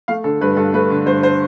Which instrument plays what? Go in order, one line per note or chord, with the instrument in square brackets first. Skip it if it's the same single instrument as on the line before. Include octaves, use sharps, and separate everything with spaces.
[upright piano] A3 F5
D3 A4
G2 B4
G2 A4
A3 B4
D3
G2 C5
C5